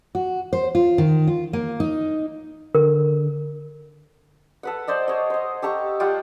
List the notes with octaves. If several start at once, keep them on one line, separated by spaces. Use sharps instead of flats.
F#4
C5
F4
D#3
F4
A#3
D#4
D3 A#4
A4 B4 F#5
C5 D5 D#5
C#5 D#5
C5 D#5
G4 A4 A#5 C#6
G3 F4 F#5 G5